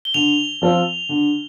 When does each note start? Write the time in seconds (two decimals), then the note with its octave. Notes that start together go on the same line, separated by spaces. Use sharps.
0.05 G7
0.14 D3 F7
0.62 F3 C4 F4 A4
1.09 D3